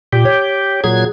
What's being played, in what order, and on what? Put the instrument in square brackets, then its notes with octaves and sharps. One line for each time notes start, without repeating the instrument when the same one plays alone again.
[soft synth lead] A#2 [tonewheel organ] G4
[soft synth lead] C#5
[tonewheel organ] A#2 F#3 G#6 [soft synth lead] G#4